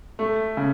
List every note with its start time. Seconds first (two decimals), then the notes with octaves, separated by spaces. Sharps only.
0.19 A3
0.57 C#3